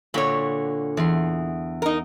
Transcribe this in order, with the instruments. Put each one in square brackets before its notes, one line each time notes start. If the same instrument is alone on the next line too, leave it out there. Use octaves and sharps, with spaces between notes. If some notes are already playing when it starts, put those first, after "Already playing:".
[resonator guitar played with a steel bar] A#2 C#5 [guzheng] D3 F#4 B5
[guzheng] E2 C6
[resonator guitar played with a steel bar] D#4 A#4